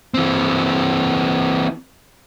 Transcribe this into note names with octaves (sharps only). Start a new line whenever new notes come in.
E3 C4